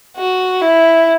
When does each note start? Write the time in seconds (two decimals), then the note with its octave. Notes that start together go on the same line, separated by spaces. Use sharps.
0.16 F#4
0.61 E4